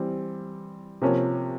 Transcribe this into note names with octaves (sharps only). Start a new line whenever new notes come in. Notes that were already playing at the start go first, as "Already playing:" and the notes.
Already playing: E3 G3 C4
C3 F3 A#3 C#4